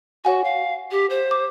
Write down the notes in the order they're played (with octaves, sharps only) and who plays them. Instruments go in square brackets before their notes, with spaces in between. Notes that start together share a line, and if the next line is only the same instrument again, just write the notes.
[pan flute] F#4 [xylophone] C#5 F#5 G#5
[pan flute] F5
G4
C5
[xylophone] D6